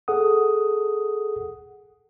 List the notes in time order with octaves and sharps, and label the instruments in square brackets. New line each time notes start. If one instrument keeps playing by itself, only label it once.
[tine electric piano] G#4 A4 F#5 D#6